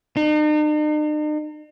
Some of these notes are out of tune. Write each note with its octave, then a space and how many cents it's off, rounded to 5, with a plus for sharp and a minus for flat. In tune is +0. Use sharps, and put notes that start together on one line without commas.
D#4 -45